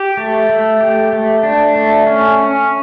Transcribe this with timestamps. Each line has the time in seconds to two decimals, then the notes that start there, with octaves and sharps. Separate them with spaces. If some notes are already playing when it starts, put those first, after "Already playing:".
Already playing: G4
0.17 A3
0.50 A3
0.81 G4
1.13 A3
1.43 D4
1.76 A3
2.07 C#4
2.38 C#4